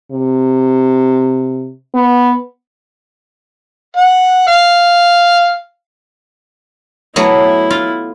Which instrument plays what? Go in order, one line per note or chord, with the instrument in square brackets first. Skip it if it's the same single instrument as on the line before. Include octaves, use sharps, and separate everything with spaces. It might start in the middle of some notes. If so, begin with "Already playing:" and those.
[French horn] C3
B3
[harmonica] F#5
F5
[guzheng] F#3 A3 B3 [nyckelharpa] E4
[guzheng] F4